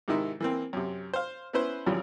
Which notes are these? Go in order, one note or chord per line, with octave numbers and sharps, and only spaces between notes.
G#2 C3 D#3 D#4 E4
E3 A#3 C4
F#2 C3
C5 F5
B3 C#4 E4 B4 C5
G#1 F#2 C#3 E3 F3 G3